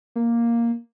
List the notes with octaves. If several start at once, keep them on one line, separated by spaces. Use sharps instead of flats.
A#3